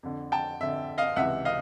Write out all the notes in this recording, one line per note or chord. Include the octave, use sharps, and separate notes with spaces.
F2 D3
G5 A5
F2 D3 E5
D#5 F5
C#2 C3 E3 E5 F#5
D#5 F5